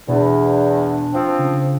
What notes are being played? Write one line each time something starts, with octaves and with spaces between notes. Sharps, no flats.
E2 B2 D4
F3 C4
C#3